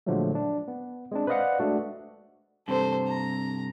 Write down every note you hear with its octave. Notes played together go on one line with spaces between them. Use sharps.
A#2 D3 F3 F#3 G#3 A3
D4
B3
G#3 C4 D4
B4 C5 D5 D#5 F5 F#5
G#3 A3 D4 F#4
G2 C3 A4 C5
A#5